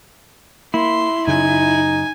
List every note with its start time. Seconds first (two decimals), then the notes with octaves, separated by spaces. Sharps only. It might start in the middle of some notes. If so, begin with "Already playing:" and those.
0.74 A#3 E4 C6
1.27 F#2 C#3 D#4 G#5